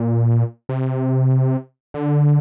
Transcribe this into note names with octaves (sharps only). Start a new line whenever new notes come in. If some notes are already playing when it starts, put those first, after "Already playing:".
Already playing: A#2
C3
D3